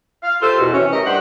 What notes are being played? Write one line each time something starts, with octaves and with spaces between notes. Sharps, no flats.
F5
F4 G4 A4 C5
E2 B2
C3 E3 C#4
A3 G4 A#4 D#5
G2 G4 C5 F#5